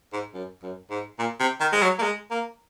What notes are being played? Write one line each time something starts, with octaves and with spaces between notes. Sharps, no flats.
G#2
F#2
F#2
G#2
A#2
C3
D#3
G#3
F#3
A#3
G#3
A#3